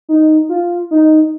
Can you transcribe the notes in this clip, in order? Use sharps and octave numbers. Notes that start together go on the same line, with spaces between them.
D#4
F4
D#4